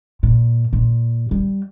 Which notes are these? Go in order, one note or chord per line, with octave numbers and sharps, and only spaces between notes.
A#2
A#2
G3